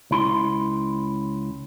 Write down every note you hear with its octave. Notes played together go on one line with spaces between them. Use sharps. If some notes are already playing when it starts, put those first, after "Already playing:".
C#2 E4 C6